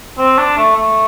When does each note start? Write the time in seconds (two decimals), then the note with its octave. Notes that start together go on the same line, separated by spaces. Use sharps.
0.18 C4
0.38 D4
0.57 A3
0.76 A3